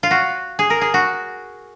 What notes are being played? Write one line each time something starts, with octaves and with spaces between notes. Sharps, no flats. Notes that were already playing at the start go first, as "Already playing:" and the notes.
F4
F#4
G#4
A#4
G#4
F#4